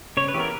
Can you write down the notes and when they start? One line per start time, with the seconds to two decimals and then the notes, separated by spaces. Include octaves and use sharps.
0.17 C#3 C#5
0.28 B4
0.34 E3 G4
0.37 B3 A#4